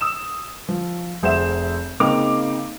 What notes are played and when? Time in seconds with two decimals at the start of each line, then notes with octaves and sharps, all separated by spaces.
0.01 D#6 E6 E7
0.68 F3
1.23 F1 G#4 C5 E5 F#5 E7
2.00 C#3 A#3 C4 D#4 D6 F7